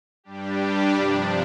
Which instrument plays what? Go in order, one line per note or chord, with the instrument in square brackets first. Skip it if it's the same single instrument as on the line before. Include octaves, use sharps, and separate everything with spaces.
[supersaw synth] G2 G3 D4 G4
C3 F3 D4